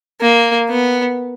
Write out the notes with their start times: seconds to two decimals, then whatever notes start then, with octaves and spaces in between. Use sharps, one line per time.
0.21 A#3
0.69 B3